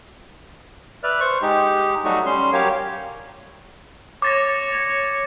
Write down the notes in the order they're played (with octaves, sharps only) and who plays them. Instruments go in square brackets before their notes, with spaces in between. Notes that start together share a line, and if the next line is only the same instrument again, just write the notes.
[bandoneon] B4 D5 E5 F6
C5 C#6
G#3 D#4 G4
F#3 G3 A3 D#4 F#4
G3 C#4 C6
F#3 G4 A#4 C#5 F5
[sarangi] C#5 [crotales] D6 A6 A#6